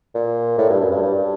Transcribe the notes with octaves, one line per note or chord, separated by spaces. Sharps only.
A#2
A2
G2
F#2
G2
G2